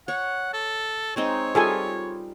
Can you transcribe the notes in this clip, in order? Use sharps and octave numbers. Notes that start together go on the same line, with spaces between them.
C#5 F#5
A4
G#3 C4 D#4 C#5
G3 F4 G#4 A4 G#5